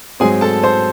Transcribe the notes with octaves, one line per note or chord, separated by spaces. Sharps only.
G#2 F#3 C4 G#4 G#5
A4 A5
C5 C6